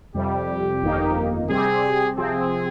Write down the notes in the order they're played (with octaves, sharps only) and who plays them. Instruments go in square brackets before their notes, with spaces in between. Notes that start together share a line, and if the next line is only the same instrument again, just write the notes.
[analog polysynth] F2 C3 G3 [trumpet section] G4
[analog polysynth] G1 F2 D#3 A#3 D#4
[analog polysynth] C3 G3 C4 G4 [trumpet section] G#4
[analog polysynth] C3 F3 C4 [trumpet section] G#4